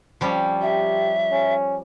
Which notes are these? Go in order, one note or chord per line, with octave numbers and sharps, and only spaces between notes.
F3 G3 C#4
G4 E5
C#4